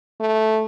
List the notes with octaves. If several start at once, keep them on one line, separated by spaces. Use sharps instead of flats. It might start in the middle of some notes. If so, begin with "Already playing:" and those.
A3